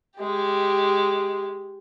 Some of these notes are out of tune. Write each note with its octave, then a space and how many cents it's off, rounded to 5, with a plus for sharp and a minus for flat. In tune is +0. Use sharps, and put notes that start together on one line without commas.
G#3 +0 G4 +0